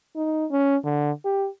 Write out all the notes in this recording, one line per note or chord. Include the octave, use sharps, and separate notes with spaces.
D#4
C#4
D3
G4